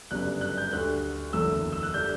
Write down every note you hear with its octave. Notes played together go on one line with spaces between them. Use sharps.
G1 F#2 C#3 G3 D4 F#6
F#6
G6
D2 D3 G3 F#6
F#1 E2 D3 A3 E6
E6
F#6
D3 G3 D4 G6